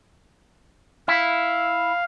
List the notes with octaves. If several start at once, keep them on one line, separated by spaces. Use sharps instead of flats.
E4 F5